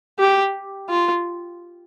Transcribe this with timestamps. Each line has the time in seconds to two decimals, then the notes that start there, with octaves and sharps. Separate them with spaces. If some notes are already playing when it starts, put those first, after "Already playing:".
0.19 G4
0.89 F4